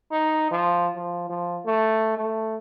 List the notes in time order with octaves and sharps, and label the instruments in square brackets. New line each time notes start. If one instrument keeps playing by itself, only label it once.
[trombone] D#4
F3
F3
F3
A3
A3